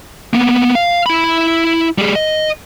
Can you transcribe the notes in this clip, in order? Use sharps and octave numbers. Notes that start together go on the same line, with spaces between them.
A#3 B3
F5
E4 B5
G3 G#4
D#5